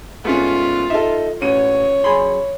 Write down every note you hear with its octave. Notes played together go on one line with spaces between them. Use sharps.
G#2 A3 B3 C#4 F4
D#4 A4 E5
A1 C#4 C#5 D#7
F#2 G#4 B5 C6